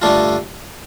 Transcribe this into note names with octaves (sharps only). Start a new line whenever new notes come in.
G2 D3 A3 D4 F4